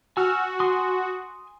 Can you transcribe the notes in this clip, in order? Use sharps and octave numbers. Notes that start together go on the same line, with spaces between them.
F#4 G#5 E6 F6
G#5 C6 D#6